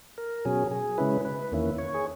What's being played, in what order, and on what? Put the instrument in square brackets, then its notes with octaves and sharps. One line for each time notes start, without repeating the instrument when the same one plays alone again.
[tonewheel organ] A#4
B2 F#3 C#4 G#4
G#4
C#3 G#3 C#4 E4 B4
B4
E2 D#3 A#3 C#4 E4
C#5
G#4